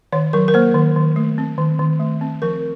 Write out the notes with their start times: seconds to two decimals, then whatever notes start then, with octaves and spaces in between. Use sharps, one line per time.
0.12 D#3 C#5
0.33 F#3 A#4
0.48 A#4
0.54 A#3 C5
0.74 D#3
0.96 D#3
1.16 A3
1.38 C4
1.58 D#3
1.79 D#3
2.00 A3
2.21 C4
2.42 F3 A#4